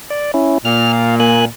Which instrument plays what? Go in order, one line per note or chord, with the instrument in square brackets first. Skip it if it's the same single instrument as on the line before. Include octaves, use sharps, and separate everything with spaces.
[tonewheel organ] D5
C#4 E4
[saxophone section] A#2 [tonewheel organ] F6
[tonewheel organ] F5
A#3 G#5 F#6